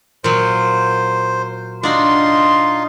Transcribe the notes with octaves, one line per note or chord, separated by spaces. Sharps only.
A#2 F#3 C5
D4 D#4 F4 F#4 C6